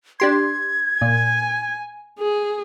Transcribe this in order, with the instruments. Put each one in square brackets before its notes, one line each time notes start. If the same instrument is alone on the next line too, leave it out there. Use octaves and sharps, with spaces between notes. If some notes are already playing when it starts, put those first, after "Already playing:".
[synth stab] D4 G4 C6 [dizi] G#6
[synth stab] A#2 [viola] G#5
[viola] G#4